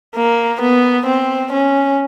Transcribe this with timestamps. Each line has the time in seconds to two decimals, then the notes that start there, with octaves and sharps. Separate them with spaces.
0.16 A#3
0.62 B3
1.07 C4
1.53 C#4